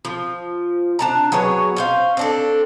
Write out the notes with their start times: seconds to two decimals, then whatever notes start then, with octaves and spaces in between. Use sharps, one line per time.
0.05 F3
0.99 D4 A5 A#5
1.32 F#3 B3 G#4 C#5
1.76 C#4 C5 F5
2.17 C4 D4 A4